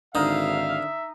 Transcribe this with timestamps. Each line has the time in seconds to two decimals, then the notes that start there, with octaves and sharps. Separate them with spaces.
0.15 G#1 D3 D#4 E5 F5